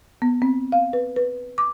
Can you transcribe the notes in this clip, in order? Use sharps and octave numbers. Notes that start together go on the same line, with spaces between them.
B3
C4
F5
B4
B4
D6